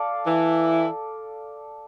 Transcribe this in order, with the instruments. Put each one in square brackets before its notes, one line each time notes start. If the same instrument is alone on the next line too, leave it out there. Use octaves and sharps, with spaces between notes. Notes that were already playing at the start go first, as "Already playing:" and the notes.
Already playing: [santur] A4 D5 F5
[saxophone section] E3 E4